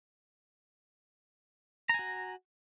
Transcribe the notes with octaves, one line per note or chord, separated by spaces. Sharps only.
F#4 G#5 A#5